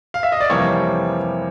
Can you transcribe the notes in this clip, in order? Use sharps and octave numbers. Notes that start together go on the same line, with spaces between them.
F5
E5
D#5
D5
F2 C3 E3 G3 A#3 C#5